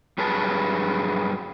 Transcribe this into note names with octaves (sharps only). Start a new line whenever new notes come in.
G2 F#3 G#4 B4 A5